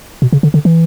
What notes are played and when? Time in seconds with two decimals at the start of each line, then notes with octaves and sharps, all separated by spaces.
0.22 B2
0.33 C#3
0.43 D3
0.54 D3
0.65 E3